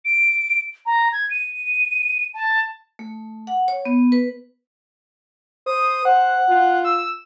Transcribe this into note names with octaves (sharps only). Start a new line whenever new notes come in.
D7
A#5
G#6
D#7
A5
A3
F#5
C#5
B3
B4
C5 D#6
C5 F#5
F4
E6